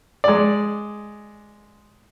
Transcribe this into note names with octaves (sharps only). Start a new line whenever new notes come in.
G#3 D5